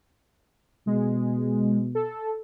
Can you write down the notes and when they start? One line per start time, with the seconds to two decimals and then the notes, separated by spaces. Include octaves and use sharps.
0.87 B2 G#3
1.95 A4